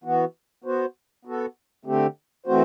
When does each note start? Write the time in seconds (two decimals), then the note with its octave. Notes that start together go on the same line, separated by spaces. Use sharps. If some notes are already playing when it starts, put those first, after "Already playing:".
0.04 E3 B3 F#4
0.64 B3 F#4 C5
1.25 B3 F#4 A4
1.85 D3 A3 C4 G4
2.46 E3 A3 C4 F#4 C5